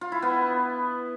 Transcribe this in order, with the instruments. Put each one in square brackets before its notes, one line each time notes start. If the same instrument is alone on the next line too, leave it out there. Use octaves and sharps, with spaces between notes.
[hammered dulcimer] F4
E4
B3